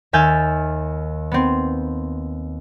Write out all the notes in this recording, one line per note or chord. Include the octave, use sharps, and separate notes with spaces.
D#2 E5 G#5 F6 G6 A6
B3 C4